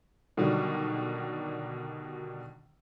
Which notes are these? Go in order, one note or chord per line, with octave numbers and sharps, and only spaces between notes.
B2 D3 D#3 F#3 G3